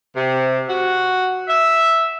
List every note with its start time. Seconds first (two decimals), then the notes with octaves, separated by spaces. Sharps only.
0.15 C3
0.68 F#4
1.48 E5